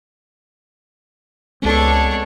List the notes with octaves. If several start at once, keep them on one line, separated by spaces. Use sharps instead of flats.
C#2 G#3 B3 C4 D4 A4 C#5